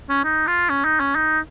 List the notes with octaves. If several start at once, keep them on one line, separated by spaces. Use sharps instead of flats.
C#4
D#4
F4
C#4
D#4
C#4
D#4